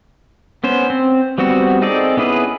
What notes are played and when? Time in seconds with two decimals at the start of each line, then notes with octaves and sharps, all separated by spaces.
0.64 B3 C#4 C5
0.90 C4
1.38 G3 B3 C4 F#4
1.82 C4 D#4 G#4 A4 D5
2.17 B3 C#4 E4 G#4 B4